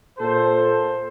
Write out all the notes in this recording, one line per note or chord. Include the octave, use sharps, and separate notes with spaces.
A#2 A4 C5